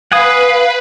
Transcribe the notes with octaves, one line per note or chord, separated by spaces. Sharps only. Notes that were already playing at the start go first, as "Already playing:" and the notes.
B4 F5 F#5 G#5 D#6